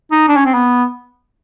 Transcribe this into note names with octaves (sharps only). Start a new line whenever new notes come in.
D#4
D4
C#4
C4
B3